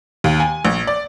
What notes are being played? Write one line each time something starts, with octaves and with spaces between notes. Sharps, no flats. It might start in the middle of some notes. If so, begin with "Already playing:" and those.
D#2
G#5
A#1
D5